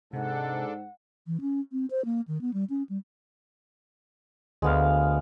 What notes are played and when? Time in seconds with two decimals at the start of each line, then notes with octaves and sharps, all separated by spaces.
0.13 G#2 C3 D4 A4 F#5
1.27 E3
1.41 C#4
1.72 C4
1.91 C5
2.05 A#3
2.28 D#3
2.41 B3
2.53 G3
2.70 C#4
2.89 G3
4.62 D2 G#3 B3 F5